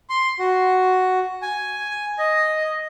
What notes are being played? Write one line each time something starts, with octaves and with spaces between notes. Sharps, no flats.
C6
F#4
G#5
D#5